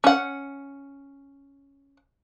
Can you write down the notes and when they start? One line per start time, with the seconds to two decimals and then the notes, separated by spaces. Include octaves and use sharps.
0.04 C#4 F#5